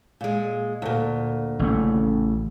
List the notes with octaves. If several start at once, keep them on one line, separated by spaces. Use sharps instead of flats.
A#2 G#3
D2 A#2
A1 C#3 A3